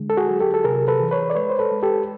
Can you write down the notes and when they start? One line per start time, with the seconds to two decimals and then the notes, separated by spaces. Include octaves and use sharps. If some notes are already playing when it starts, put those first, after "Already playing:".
Already playing: D3 G#3
0.10 A4
0.17 F#4 G#4
0.29 F#3
0.40 G4 A4
0.54 A4
0.64 C3 G#4 A#4
0.88 A4 B4
1.00 E3
1.11 B4 C#5
1.30 D5
1.35 G#3 B4 C#5
1.49 C5
1.59 A4 B4
1.72 G#3
1.83 G4 A4